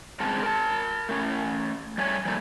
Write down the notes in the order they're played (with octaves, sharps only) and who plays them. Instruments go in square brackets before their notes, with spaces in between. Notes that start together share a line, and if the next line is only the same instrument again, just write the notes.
[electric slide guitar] G2 C#3 G#3 C4 A#4 A5
A#4 A5
A3 C#4
G3 A3 C#5 G#5
F3 G3 A3 A#3